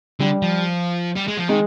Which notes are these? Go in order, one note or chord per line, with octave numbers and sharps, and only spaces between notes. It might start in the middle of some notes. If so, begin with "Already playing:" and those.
D3 G3
F3
G3
G#3
F3
D#3 G#3